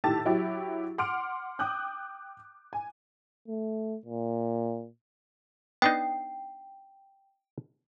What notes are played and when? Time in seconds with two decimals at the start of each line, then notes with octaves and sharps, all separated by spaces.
0.04 A2 D#3 G4 A5 E6 A6
0.25 F#3 E4 G4
0.98 F#5 C6 D6 F6 D7
1.59 G5 D6 D#6 F#6 G6
2.73 G#5
3.48 A3
4.06 A#2
5.82 B3 D4 D#4 G5